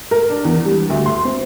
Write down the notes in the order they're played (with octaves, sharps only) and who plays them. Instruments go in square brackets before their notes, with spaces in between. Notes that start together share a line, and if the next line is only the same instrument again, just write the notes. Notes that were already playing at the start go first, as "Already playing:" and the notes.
[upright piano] A#4
D4
E2
G3
D2
C6
C4